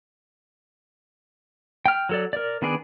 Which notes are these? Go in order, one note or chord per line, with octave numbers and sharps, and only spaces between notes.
G5 F6
F#3 A4 D5
A#4 D5
D#3 B3 D4 G#4 D5